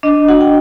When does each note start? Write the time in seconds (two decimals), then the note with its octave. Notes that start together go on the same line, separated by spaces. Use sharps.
0.03 D4 D#5
0.28 F#4 F#5
0.41 G5